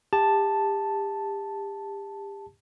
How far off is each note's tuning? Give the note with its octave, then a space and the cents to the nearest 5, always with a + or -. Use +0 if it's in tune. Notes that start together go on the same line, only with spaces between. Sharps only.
G4 +30 A5 +0